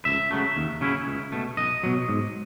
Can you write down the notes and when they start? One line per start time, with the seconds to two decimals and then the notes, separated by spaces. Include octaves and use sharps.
0.05 C#2 E5
0.31 C#3 F#3 A3
0.57 D#2
0.81 C#3 F#3 C#4 E4
1.07 C#2
1.32 B2 A3
1.57 B1 D#5
1.83 B2 F#3
2.09 G#2